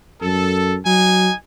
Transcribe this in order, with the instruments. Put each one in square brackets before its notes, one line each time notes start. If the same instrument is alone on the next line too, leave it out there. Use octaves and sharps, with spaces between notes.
[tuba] F#2 [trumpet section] A4
[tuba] F#3 [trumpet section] D#4 G#5